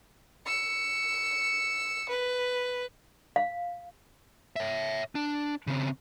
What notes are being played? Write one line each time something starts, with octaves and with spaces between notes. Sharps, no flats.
E6 C#7
B4
F5
C#5 E5
D4
C#3 C4